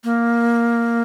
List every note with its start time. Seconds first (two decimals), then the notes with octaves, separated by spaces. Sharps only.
0.04 A#3